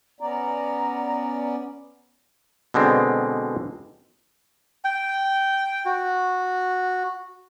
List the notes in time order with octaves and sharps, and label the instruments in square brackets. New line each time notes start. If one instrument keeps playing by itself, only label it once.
[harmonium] B3 C#4 D5 [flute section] A#5
[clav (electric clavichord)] B2 D3 G#3 C4
[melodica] G5
F#4